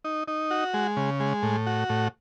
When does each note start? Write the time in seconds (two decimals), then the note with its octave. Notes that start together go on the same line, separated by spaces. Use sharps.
0.04 D#4
0.28 D#4
0.51 F#4
0.74 G#3
0.97 C#3
1.20 G#3
1.43 A2
1.67 F#4
1.89 A2